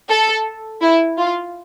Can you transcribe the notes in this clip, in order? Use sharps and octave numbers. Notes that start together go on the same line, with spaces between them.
A4
E4
F4